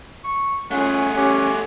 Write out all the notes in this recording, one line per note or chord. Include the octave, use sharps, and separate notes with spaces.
C#6
A3 C#4 F4 G#4 F#5
C#4 G4